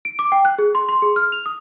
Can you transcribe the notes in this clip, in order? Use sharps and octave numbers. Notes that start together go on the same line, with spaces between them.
D7
D6
G5
F#6
G#4
C6
C6
G#4
F6
F7
D#6